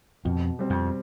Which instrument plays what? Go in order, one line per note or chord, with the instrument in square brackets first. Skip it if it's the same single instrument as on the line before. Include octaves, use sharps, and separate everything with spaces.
[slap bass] F2 [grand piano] B2
[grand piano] G3 C4
[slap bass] F2